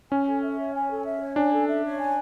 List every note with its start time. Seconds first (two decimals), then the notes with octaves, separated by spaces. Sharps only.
0.11 C#4 G#5
0.26 A4
0.42 E5
0.58 C#5
0.74 G#5
0.89 A4
1.05 E5
1.21 C#5
1.36 D4 G#5
1.52 A4
1.67 E5
1.84 C#5
1.99 G#5